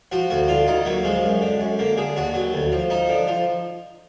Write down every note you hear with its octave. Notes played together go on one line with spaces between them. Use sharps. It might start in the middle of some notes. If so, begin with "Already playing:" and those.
F3 F#4
D2 F#4
D3 F4
D2 D#4
F#3 A#3
F3 G#3
F#2
D3
F#2
D3 A#3
D3 G#4
D#2 F#4
F#3
D2
F3
F3 D#4
D3
F3